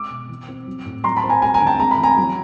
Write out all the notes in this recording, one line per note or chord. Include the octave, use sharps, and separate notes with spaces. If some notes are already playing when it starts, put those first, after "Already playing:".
Already playing: G#3 D6 E6
B2
E3
C4
F#3
A2
F#3 A#5 C6
A5 B5
C4
G#5 A#5
G3 G#5 A#5
G#5 A#5
D3
G5 A5
G#3 A#5
B5
E3
G#5 A#5
F#3